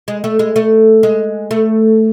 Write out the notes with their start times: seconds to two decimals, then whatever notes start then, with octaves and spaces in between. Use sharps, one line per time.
0.08 G#3
0.24 A3
0.39 G#3
0.56 A3
1.03 G#3
1.51 A3